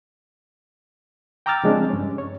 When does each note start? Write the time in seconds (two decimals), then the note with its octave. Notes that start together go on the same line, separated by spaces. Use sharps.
1.46 G5 A#5 D6 E6 F6 A6
1.64 C#3 F3 G#3 C4 D4
1.90 G2 C#4
2.18 C#5